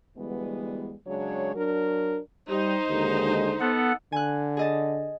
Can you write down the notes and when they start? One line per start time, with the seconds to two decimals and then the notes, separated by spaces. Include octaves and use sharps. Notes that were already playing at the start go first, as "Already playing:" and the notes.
0.17 D2 E3 G3 G#3 B3
1.07 C#3 F#3 G#3 D4 C#5
1.55 F#3 D4 A#4
2.49 G3 D#4 C5
2.89 D#2 D3 G#3
3.61 B3 A4 F#5
4.12 D3 G#5 F#6
4.57 G#4 D#5 A5